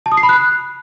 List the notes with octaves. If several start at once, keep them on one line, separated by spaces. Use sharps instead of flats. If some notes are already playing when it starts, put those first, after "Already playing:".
A5
D#6
C7
B5
F#6